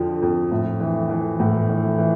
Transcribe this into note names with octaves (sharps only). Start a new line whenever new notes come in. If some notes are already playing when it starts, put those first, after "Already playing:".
Already playing: F2 D3 F3
F2
A2
E3
E3
A2
E3
E3